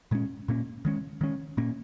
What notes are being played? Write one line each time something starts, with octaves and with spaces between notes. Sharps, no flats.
A#2 G#3 C#4
A#2 A#3 C#4
D#3 G#3 C#4
D#3 G#3 C#4
A#2 A#3 C#4